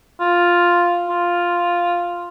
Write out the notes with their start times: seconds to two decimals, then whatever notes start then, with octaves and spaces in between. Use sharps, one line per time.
0.20 F4
1.08 F4